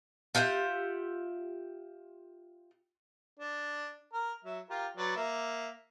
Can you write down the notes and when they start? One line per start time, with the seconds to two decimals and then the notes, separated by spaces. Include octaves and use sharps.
0.35 F4 G4 E5 F#5
3.39 D4
4.13 A#4
4.44 F#3 E5
4.70 F4 G4 A#4
4.97 F#3 B4 D5
5.16 A#3 E5